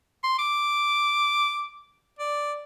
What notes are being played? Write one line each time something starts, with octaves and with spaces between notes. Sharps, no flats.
C6
D6
D5